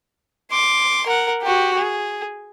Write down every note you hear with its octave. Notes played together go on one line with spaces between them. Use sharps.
C6 D6
A#4 F#5
F#4 G4
G#4